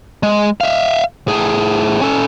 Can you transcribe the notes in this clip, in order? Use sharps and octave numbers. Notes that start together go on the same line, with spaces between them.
G#3
E5 F5
A2 G#4
C#4 A4